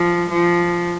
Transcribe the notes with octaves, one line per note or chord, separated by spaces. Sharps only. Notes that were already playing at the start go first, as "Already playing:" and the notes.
Already playing: F3
F3